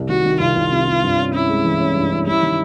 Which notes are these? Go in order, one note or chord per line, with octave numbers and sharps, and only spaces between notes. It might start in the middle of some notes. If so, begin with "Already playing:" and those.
Already playing: C2 C3
D#3 F#4
D#3
C2 F4
C2
C3
C3
G2
C#4
C#4 E4
G#3
E3
C#4
G2
C#4
G3 E4
D#3